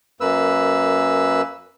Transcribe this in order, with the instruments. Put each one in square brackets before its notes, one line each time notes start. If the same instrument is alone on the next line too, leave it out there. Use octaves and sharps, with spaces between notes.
[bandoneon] F#2 A#3 B4 E6